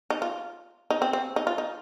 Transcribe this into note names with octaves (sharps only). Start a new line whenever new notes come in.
D#4
F4
D#4
C4
C4
D#4
F4
D#4